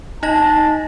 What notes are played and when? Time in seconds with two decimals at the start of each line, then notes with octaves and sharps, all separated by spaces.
0.23 D#4 D#5 A5 A#6